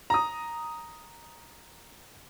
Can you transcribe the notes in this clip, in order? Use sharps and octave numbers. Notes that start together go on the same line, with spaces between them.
A#5 D#6